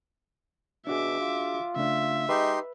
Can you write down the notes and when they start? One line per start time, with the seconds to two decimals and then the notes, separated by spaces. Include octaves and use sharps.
0.87 B2 D4 F#4 G#4 E5 D6
1.20 F4
1.76 C#3 A3 D4 E5
2.29 G#3 D#4 G4 B4 C6